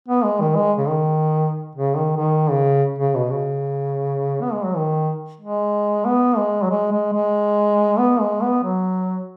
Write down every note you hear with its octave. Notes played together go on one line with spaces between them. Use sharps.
B3
G#3
D#3
G#3
C#3
D#3
C#3
D#3
D#3
C#3
C#3
B2
C#3
B3
G#3
F#3
D#3
G#3
B3
G#3
F#3
G#3
G#3
G#3
B3
G#3
B3
F#3